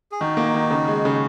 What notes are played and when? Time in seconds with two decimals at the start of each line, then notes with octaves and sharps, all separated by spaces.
0.12 G#4
0.20 D#3 D#4 F#4
0.37 A#3
0.54 D#3
0.71 C#3
0.88 G#3
1.05 C#3